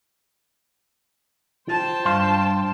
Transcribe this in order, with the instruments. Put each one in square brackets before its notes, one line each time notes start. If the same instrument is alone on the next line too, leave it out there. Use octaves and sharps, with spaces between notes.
[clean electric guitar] F4 [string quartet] C5 G5 A5
[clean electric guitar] G2 F5 C6